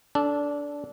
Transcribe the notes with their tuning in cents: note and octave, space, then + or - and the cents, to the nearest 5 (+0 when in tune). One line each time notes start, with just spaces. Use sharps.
D4 -15 A4 -5